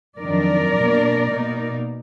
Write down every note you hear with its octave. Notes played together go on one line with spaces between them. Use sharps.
F2 D#3 F#3 D4 A#4 D5
B2 A#3 D4
B2 A#3 D#4